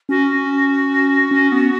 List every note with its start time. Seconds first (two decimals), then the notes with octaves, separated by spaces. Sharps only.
0.09 C#4 F#4
1.31 C#4
1.52 B3